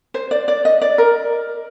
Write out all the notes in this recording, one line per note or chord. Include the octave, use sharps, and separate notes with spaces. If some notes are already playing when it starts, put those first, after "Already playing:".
C5
D5
D5
D#5
D5
A#4